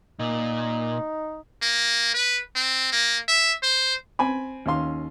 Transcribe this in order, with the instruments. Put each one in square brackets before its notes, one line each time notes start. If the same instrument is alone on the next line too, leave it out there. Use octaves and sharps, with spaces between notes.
[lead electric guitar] A#2 [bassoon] D#4
[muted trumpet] A#3
B4
C4
A#3
E5
C5
[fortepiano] C4 G#5 B5
D#2 C#4 F5 C6